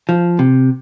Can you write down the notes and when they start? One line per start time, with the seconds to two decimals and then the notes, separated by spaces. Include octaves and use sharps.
0.09 F3
0.39 C3